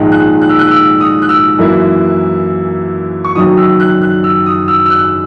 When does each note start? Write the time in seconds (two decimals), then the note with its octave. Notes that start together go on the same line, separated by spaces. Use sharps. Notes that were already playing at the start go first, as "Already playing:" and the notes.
Already playing: A#1 G#2 D#3 G#3 D#4
0.12 F#6
0.42 F#6
0.49 E6
0.59 F#6
0.71 E6
1.00 D#6
1.22 F#6
1.29 E6
1.59 F#2 E3 A#3 E4
3.25 C#6
3.35 F#1 F#2 D#3 F#3 D#6
3.58 E6
3.80 F#6
4.02 F#6
4.24 E6
4.46 D#6
4.68 E6
4.86 E6
4.90 F#6